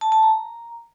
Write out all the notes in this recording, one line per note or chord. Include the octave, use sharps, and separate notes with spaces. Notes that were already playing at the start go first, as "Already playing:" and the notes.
A5
A5
A#5